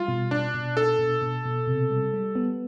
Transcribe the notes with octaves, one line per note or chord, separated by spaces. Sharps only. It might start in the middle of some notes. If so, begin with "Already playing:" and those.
Already playing: G3 F4
B2
B2 D4
B2
D4 A4
B2
B2
B2
C3
G3
G3
B3